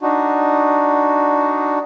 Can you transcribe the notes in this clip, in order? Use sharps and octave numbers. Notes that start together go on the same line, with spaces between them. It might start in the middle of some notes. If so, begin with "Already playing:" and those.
D4 D#4 F#4